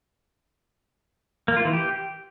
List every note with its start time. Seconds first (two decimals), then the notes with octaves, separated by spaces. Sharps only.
1.48 A#3
1.57 F4
1.65 E3
1.73 G4